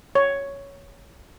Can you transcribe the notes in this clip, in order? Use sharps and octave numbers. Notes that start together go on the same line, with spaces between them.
C#5